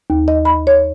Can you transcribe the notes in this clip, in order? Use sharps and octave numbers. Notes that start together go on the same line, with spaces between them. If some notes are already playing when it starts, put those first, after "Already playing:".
D#2
D#5
B5
C#5